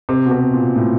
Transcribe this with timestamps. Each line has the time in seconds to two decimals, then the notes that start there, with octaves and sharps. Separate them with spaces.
0.09 C3
0.26 B2
0.31 C3
0.53 A#2
0.76 A2